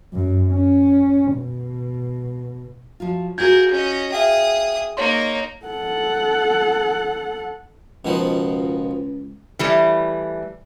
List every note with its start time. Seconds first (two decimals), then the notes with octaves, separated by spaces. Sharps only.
0.14 F#2
0.53 C#4
1.34 B2
3.00 F3 F#3 F4
3.38 F4 F#4 G#4 A#4 G6 G#6
3.71 C#4 D#5
4.12 G#4 E5 F5 G5 D#6
4.97 A#3 D#4 C#5 C6
5.66 A4 F#5
8.05 C#2 B2 D#3 F3
9.59 E3 G3 A3